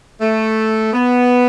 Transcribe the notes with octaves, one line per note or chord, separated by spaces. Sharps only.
A3
B3